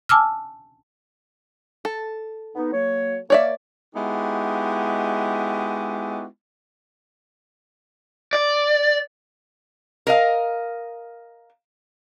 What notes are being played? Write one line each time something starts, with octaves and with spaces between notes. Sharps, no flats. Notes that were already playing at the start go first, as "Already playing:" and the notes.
G#5 A5 D6 E6 F6
A4
B3 D#4
F#3 A#3 C#5
A#3 C#5 D5 E5
G#3 B3 D#4 E4 F#4 G4
D5
A#4 D#5 F5